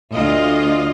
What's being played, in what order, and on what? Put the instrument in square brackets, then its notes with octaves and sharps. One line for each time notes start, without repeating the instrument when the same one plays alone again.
[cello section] D2 F4 D#5